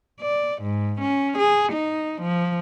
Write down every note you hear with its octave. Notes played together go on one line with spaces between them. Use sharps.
D5
G#2
C#4
G#4
D#4
F3